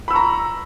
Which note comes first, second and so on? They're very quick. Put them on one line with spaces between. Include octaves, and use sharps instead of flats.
B5 E6 C#6 A#5